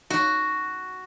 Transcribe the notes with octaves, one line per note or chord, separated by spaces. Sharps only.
F#4